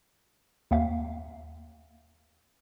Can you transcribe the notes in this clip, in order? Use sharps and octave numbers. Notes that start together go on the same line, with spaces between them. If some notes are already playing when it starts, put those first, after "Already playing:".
D#2 E5 F5